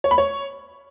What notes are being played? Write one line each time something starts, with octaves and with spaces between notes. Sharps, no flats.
C#5
B5
C#5